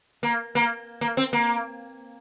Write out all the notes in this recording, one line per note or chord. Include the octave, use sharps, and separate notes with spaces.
A#3
A#3
A#3
C4
A#3